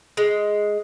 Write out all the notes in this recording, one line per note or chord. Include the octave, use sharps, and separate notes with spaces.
G#3